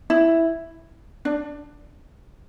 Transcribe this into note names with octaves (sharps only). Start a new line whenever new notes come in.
E4
D4